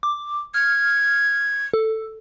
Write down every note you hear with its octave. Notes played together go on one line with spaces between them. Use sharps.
D6
F6 G#6
A4